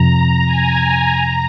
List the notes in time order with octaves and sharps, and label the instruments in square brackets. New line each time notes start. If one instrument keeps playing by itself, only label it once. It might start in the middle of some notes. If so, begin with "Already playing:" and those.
Already playing: [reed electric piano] F2 C3 F3 [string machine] A#5
[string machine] G#5
A#5